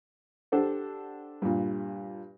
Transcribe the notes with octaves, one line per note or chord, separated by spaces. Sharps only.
D4 G4 A4 C5 F#5
G2 A#2